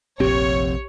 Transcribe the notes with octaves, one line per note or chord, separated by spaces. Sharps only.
F1 A#1 C4 G4 C#5